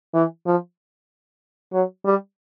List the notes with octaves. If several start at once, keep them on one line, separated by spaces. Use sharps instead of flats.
E3
F3
F#3
G3